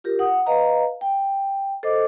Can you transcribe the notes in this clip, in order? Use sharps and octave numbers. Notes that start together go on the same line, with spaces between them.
F4 G4 A#4
F#5 D#6
B4 D#5 F5 A#5
G5
A4 C5 D#5 D6